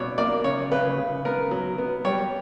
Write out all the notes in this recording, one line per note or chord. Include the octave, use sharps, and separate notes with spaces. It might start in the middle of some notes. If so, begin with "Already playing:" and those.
Already playing: B2 C#5 D5
A#3 D5
C#3 C#5
C#3 B4
C#3
B3 A#4
F#3
B3
G3 C#5